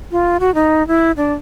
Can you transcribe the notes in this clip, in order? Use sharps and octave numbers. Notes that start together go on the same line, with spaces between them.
F4
F#4
D#4
E4
D4